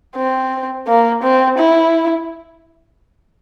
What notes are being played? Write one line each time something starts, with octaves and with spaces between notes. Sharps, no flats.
C4
A#3
C4
E4